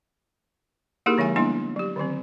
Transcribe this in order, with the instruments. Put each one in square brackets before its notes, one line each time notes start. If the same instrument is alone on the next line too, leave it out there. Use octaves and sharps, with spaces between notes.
[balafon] A#3 D#4 E4 G4 G#4 A#4
D3 F3 G#3 E5 G#5
G3 A#3 B3 D4 E4 C6
F#3 G4
D3 D#3 F#3 C4